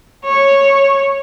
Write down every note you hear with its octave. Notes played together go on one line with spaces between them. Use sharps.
C#5